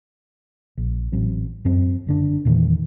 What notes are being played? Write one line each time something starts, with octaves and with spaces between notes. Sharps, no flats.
A#1
A1 F#3 C4
F#2 F#3 C4
F#1 D3 D4
E2 A#2 D#3 E3